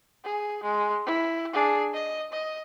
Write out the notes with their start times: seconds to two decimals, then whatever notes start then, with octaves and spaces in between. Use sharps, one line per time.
0.24 G#4
0.64 G#3
1.06 E4
1.53 D4 G#4
1.93 D#5
2.32 D#5